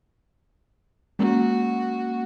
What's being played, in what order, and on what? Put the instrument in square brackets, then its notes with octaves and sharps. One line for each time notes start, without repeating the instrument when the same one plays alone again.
[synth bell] G#3 A#3 C#4 [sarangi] F#4